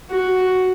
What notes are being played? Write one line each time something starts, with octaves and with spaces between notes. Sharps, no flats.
F#4